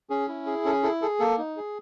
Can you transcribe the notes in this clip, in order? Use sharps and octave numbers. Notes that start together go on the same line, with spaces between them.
C#4 G#4
E4
G#4
C#4 A4
E4 A4
G#4 A4
A#3 A4
D#4
G#4